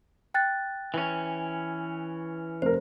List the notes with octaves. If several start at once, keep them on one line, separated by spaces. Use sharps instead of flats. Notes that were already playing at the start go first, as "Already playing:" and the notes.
G5 F#6 A6
E3 C#4
F1 A#4 C5